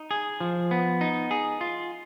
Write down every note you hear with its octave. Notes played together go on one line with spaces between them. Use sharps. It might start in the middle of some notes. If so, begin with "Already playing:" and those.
Already playing: D#4
G#4
F3
B3
D#4
G#4
F4